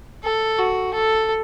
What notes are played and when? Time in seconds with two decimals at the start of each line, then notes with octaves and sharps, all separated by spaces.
0.24 A4
0.59 F#4
0.94 A4